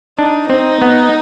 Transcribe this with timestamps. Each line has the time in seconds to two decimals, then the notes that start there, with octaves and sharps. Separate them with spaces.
0.19 D4 D#4
0.49 C4 D#4
0.82 B3